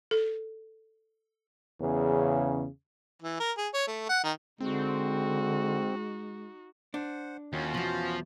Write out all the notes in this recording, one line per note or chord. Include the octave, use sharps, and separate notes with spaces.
A4
E2 C#3
E3
A#4
G#4
C#5
A3
F#5
D#3
D3 G#3 C4 D#4 F#4
D4 C5 F#5
D#2 C#4 F4 F#4
E2 B2 F3